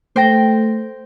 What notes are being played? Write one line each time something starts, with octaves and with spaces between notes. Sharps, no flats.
A3 C5 G5 A#6